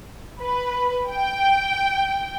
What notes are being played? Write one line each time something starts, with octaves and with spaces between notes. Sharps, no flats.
B4
G5